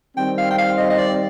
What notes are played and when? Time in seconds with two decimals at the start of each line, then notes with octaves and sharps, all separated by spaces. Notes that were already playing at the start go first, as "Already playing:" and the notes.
0.17 D#3 G3 C4 G5
0.38 F5
0.51 G5
0.58 F5
0.78 D#5
0.90 D#5
0.99 D5